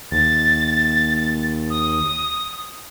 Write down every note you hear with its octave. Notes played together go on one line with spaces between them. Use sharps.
D#2 A6
D#6